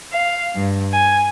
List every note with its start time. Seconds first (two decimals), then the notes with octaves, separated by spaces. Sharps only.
0.12 F5
0.55 G2
0.92 G#5